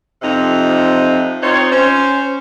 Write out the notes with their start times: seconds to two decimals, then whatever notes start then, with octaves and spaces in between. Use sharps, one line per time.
0.22 F2 C3 F3 D#4
1.43 C4 D#4 F4 C5 C#5
1.72 C#4 C5